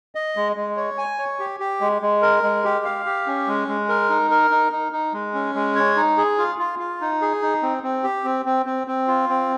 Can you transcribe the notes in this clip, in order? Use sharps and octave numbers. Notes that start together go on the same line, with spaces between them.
D#5
G#3
G#3
C#5
G#5
C#5
G4
G4
G#3
G#3
A#4
G#3
G4
F5
G4
C#4
G#3
G#3
A#4
D#4
A#4
D#4
D#4
D#4
G#3
C#4
G#3
C#5
D#4
G#4
F4
F4
F4
D#4
G#4
D#4
C4
C4
G4
C4
C4
C4
C4
F4
C4